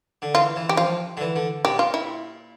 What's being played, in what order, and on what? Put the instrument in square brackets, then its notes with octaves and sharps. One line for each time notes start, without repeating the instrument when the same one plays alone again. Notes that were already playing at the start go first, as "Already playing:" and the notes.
[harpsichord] D3
[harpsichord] E3 [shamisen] F4
[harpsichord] E3
[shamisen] G4
[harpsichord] F3 [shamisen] F4
[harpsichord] D3
E3
D3
[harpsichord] A#2 [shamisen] G4
[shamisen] F4
E4